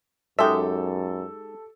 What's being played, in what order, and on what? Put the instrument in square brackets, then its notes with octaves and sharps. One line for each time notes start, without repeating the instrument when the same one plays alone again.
[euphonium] F#2 [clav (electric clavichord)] G#3 D#4 [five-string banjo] G4 E5 [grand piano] A4